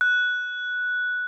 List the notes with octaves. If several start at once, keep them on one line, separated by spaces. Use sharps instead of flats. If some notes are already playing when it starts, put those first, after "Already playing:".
F#6